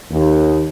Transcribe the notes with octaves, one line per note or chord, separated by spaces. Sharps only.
D#2